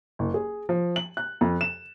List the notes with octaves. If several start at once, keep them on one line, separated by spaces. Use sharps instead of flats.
F#1
G#4
F3
F#7
F#6
F2
E7